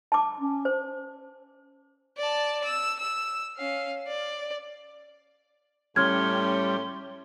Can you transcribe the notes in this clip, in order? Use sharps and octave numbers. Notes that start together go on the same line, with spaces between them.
A5 D6
C#4
C5
D5 A5
E6
E6
C#4 F5
D5
A2 G3 C#4 C6 F6 G#6